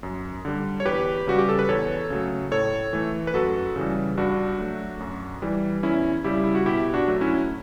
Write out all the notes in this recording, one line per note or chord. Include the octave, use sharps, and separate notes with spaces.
F#2
D3 G3
C#5
E2 G4 B4
C#3 G3 F#4
G4
A4
B4
E2 A4 C#5
C#3 F#3 A3
A2 A4 C#5
E3 A3
B4
F#2 F#4 A4
C#3 E3 G3
G2 D4 F#4
F#3 A3
F#2
E3 G3
E2 C#4 E4
C#3 G3 E4 G4
E4
F#4
B2 E4 G4
D4 F#4
F#3 A3
C#4 E4